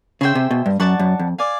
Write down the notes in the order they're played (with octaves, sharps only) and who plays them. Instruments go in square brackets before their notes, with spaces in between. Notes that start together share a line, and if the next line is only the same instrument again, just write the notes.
[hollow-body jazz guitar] C#3 [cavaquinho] G#4 C5 E5 G5
[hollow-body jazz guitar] C3
B2
G2
[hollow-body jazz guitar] F#2 [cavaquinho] D5 F#5 A5 C#6
[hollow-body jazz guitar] F#2
F2
[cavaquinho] D5 F5 G#5